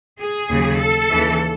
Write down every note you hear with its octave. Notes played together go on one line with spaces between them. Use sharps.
G#4
D#2 C#3 F#3
A4
D#2 C#3 E3